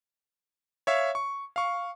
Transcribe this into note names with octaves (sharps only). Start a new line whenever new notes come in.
C#5 E5 F5
C#6
F5 C#6